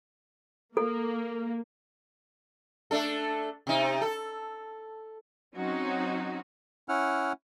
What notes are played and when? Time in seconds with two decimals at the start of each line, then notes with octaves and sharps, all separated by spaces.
0.77 A#3 A4
2.91 A3 D4 A4
3.67 C3 D#4
4.01 A4
5.55 F#3 C4 C#4 D#4 F#4
6.89 C#4 E4 F#5 F6